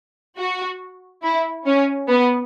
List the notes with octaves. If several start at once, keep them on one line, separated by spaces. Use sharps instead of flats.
F#4
E4
C#4
B3